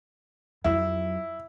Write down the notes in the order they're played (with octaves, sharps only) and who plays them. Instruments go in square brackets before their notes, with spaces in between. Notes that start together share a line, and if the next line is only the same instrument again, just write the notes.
[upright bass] F2 F#3 [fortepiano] E4